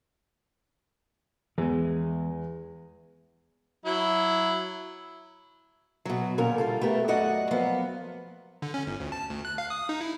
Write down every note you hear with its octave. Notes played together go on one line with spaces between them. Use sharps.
E2 E3 G#3
F#3 E4
B2 F#3
A#2 D3 C#4 A#4
G3 F4 A4
A3 B3 G4 A#4
F#2 A3 F#4 D5 D#5 F#5
F3 F#3 A#3 B3
D3
C#4
G1
D2
A5
D2
F#6
F5
D#6
D#4
E4